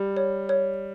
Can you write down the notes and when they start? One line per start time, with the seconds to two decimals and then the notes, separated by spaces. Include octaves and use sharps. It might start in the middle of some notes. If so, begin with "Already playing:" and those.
Already playing: G3
0.17 C#5
0.49 C#5